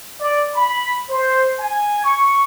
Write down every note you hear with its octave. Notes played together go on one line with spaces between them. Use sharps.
D5
B5
C5
G#5
C#6